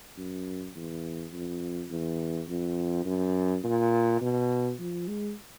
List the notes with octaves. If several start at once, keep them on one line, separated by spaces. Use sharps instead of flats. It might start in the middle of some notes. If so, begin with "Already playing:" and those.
F#2
E2
F2
E2
F2
F#2
A#2
B2
F3
G#3